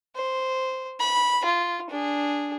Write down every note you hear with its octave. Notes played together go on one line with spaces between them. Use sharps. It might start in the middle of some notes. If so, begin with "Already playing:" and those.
C5
B5
F4
D4 G#4